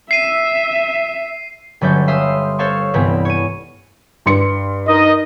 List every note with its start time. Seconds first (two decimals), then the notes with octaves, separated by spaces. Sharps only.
0.11 E5 C7 D#7
1.81 G1 F#3 G3 A3 C#4 G6
2.07 E5 F5 C6 D#6 E6
2.59 A4 C5 C#5 F5 A5 C#6
2.94 C2 G2 E3 G#3 B3 C4
3.25 C#5 D#7
4.26 G2 C6 C#7
4.88 D#4 A#4 D#5